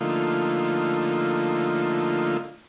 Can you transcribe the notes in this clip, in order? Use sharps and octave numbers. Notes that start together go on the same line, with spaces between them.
D3 F3 A3 A#3 D#4 F4